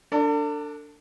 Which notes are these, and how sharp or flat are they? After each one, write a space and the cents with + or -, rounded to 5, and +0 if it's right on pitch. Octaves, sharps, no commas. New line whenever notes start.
D4 +0 A4 +40